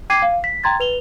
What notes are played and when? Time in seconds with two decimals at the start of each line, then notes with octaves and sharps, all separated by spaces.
0.10 G5 D6 G#6 C7 D#7
0.22 F5
0.44 B6
0.64 G5 A#5 C6 G#6 A6
0.80 B4 F7 G7